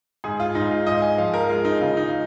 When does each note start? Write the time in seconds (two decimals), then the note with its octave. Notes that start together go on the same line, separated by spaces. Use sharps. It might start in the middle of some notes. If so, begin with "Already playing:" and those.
0.24 G#2 G#4
0.40 F4
0.55 G#2 D#4
0.71 F4
0.87 G#2 D#5
1.02 G#5
1.18 F3 F5
1.34 A#4
1.49 G#3 F4
1.65 D#4
1.81 C#3 F4
1.97 D#4